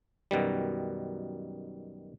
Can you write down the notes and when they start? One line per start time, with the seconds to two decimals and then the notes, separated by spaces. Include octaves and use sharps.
0.31 F#2 B2 D#3 G3